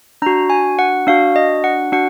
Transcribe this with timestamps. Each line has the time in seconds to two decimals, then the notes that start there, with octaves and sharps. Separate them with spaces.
0.22 D4 F#4 A#5
0.50 G#5
0.79 F#5
1.07 D4 F#4 F5
1.36 D#5
1.64 F#5
1.92 D4 F#4 F#5